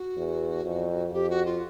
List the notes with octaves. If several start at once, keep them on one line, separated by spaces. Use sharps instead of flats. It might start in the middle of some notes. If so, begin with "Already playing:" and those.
Already playing: F#4
E2
F2
F#4
F2 G4
F#4
F4